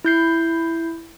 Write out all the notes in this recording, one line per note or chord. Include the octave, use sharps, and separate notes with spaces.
E4 G6 C7